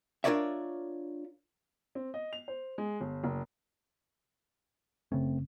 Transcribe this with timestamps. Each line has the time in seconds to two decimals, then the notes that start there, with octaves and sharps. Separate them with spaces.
0.24 D4 F4 A#4 C#5 D5 E5
1.95 C4
2.14 D#5
2.33 F7
2.48 C5
2.78 G#3
3.01 G1
3.24 F#1
5.12 F#1 C#3 A3 C4 C#4